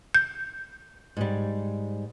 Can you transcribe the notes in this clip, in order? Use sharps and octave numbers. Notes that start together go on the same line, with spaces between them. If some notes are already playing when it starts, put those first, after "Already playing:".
G6
G#2 G3